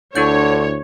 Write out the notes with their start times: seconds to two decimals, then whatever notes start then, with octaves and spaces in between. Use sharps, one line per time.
0.15 D2 D3 D4 E4 C#5 G6